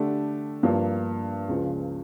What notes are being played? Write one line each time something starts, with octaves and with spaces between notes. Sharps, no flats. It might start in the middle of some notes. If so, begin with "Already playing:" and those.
Already playing: D3 A3 D4 G4
G2 F3 A#3
C#2 C#3 F3